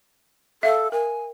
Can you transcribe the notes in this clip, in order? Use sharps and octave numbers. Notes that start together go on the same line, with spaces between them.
A4 E5 F5
A#4 G#5